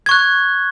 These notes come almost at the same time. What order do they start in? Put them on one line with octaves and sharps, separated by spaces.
G#6 C#6 F#6